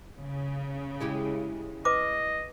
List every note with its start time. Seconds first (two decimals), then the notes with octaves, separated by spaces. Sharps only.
0.20 C#3
1.00 G#3 E4 G4
1.85 B4 D#5 D6